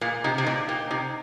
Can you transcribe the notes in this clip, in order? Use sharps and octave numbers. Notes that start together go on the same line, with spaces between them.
A#2 G#3
C3 D#4
C3
A#2 D#4
A#2 G4
C3 D#4